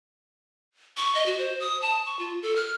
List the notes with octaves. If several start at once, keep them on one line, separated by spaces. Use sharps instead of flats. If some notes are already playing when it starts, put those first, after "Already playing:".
C#6
D#5
F#4
C5
D#6
A5
C#6
F4
A4
F6